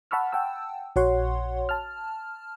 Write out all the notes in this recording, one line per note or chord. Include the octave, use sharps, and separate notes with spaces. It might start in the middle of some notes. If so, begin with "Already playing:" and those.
F#5 A5 B5 C#6 E6 F6
F#5 G5 A5 E6
A#1 F#4 C#5 F#5 C6
A5 F6